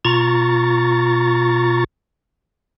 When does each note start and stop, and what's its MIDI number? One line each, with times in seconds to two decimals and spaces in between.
0.05 1.84 47
0.05 1.84 65
0.05 1.84 82
0.05 1.84 85
0.05 1.84 93